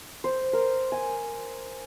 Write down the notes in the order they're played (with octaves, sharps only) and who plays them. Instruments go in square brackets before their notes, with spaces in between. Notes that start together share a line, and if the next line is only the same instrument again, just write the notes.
[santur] C5
A#4
G#5